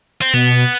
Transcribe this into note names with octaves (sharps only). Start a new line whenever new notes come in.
C4
B2 B3